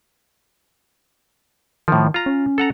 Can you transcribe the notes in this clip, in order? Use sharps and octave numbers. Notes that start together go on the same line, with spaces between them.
A2 D#3 F3
F4 A#5
C#4
A4 F#5 A#5